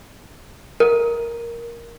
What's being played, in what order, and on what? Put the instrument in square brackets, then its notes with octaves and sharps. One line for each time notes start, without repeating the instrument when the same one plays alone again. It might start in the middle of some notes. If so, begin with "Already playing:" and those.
[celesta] A#4